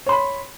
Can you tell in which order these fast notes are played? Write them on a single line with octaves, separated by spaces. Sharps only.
C#5 C6 B5